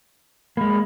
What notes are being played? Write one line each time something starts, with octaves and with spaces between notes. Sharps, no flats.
G#3 A#3 B5